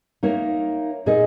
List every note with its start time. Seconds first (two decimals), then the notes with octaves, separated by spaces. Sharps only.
0.23 A#3 D#4 A#4 C#5 E5
1.06 A#2 A#3 D#4 G#4 D#5